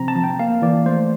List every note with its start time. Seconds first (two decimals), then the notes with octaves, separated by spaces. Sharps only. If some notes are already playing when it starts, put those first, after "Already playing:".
Already playing: C3 F3 C4 A#5
0.08 A5
0.15 F3
0.24 G5
0.39 A#3 F5
0.62 E3 D5
0.86 A3 C5